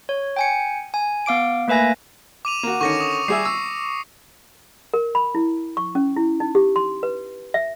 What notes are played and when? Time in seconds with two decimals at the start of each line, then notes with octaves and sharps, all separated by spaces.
0.09 C#5
0.36 G5 G#5 C#7
0.94 G#5
1.26 B3 F5 D6 D7
1.68 A3 A#3 B4 E5 G#5 A#6
2.45 D6 D#7 F7
2.63 A#3 F#4
2.81 D3 D#3 C#4 C#6 A#6 C#7
3.01 D#6
3.28 G3 G#4 E5 C7
3.45 E6
4.94 A#4
5.15 B5
5.35 E4
5.77 C#6
5.95 C#4
6.16 E4
6.40 D#4
6.55 G4
6.76 C6
7.03 B4
7.54 E5